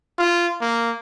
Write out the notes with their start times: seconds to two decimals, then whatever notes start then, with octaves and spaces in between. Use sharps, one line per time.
0.18 F4
0.61 A#3